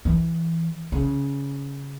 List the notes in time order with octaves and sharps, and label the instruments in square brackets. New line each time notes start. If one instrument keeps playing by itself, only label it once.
[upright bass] E3
C#3